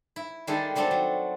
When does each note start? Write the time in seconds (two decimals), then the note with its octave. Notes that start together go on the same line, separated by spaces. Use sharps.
0.16 E4
0.47 D#3 G3 G#3 D4 E4 A4
0.75 F#3 G3 C4 D4 A4
0.91 F#3